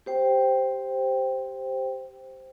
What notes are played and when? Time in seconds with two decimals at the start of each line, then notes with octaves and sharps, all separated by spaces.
0.06 G4 C5 G5